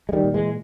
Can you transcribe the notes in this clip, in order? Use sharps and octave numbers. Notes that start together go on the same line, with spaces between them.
G#3
D#3 G3
A#2
E3 G#3